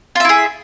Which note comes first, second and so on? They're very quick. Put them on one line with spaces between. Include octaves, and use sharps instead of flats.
F4 E5 E4 G#4